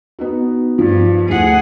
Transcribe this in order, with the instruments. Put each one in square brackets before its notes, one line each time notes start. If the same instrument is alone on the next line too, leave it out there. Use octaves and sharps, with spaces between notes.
[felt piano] B3 D#4 F#4
[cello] G2 [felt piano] F3
[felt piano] D2 E4 [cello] G#4 F#5